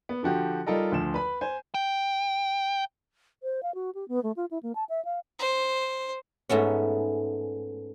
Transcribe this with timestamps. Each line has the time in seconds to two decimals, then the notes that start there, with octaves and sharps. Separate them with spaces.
0.09 B3
0.23 D3 F3 F#4 G4
0.66 G3 D#4 F4 A4 A#4 D#5
0.92 D2 F3 E7
1.14 B4 B5
1.41 C5 G#5
1.74 G5
3.43 C5
3.63 F5
3.74 F#4
3.95 G4
4.08 B3
4.23 A3
4.36 F4
4.51 E4
4.63 A#3
4.75 A5
4.89 E5
5.05 F5
5.39 C5
6.49 G#2 A3 B3 C#4